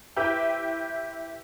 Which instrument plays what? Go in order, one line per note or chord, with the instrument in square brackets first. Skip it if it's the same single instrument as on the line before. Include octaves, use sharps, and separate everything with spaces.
[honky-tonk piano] E4 G4 B4 C5 E5 G5